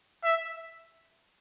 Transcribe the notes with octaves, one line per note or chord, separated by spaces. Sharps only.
E5